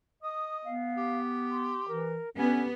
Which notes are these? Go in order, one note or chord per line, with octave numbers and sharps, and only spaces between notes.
D#5 D#6
B3 F5
G4
C6
E3 A#4
D3 B3 C#4 G4